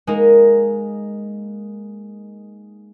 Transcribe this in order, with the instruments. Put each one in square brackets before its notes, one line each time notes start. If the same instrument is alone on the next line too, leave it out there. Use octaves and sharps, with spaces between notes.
[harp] G#3 A#3 D#4 A#4